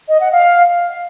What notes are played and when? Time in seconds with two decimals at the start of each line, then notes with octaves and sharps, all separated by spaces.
0.09 D#5
0.20 F#5
0.32 F5